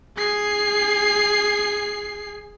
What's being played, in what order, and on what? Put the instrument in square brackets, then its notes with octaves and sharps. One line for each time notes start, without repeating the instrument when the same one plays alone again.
[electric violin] G#4 C7